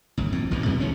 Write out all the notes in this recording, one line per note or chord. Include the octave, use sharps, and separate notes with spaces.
G1 D#2
F2 A2
A1 D#2 B2 E3
F#2 C3 G3 B3
C#2 D#3 E3 C#4